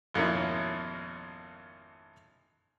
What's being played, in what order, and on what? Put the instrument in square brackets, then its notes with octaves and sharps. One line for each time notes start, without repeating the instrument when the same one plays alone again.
[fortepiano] G#1 F2 B2 A#3 C#4 E4